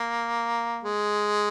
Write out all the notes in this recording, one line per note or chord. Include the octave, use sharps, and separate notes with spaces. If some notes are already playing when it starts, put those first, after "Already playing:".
Already playing: A#3
G#3